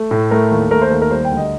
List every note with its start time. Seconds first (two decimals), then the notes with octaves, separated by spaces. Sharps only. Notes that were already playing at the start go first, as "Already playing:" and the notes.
Already playing: A3
0.11 A2
0.31 A3 A#4
0.51 D#2
0.71 A3 A#4
0.82 C5
0.90 D#2 A#4
1.02 A#4
1.10 G3 C5
1.25 G5
1.31 D2
1.37 D#5